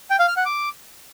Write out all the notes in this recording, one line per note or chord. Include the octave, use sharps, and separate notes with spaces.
G5
F5
F6
F#5
D6